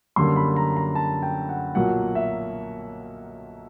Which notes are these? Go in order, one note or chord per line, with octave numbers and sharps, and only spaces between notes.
F#2 D3 G3 A#3 C6
B5
A#5
A#5
A5
G5
F#5
B1 A#2 F#3 A#3 F#5
E5